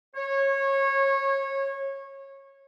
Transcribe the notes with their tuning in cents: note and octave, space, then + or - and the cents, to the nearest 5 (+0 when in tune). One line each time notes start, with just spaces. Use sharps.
C#5 -20